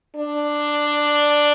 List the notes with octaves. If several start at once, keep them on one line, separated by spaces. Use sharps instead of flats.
D4